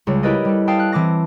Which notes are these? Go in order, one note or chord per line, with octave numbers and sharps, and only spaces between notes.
C#2 C#3 G3
E4 G4 A#4 B4 D5 D#5
G3 A4
F5 G5 A5 D#6 F6
F#6
E3 C4 A5 D6 A#6